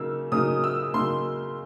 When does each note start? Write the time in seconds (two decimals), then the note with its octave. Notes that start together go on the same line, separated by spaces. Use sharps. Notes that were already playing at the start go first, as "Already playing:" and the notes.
Already playing: C#3 F#3 A#3 D#4 E6
0.32 C#3 F#3 A#3 D#4 D#6
0.64 E6
0.94 C#3 F#3 A#3 D#4 C6